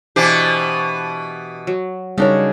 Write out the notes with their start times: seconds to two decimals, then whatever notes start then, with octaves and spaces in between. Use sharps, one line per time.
0.16 B2 E3 D4 G4 C5
1.67 F#3
2.18 C#3 G3 D4 D#4 A#4 C#5